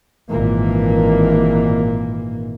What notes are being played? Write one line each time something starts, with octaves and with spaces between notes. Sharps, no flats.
G#1 A#2 E3 A#3